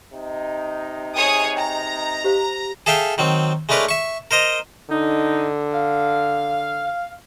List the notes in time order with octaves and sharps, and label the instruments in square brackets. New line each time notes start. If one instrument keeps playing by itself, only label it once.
[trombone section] C3 D#4
[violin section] G#4 C#5 D#6
[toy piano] G5 [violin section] A#5
[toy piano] G4 C5 F5
[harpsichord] G#4 A4 E5 F5 G5
D#3 F#3 C4
G#3 A3 D4 A#4 B4 C#5
E5 C#6
A#4 C5 D#5 A#5
[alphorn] D3 [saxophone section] D#4
[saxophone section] F5